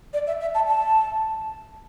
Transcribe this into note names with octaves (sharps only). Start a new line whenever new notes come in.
D5
E5
E5
A5
A5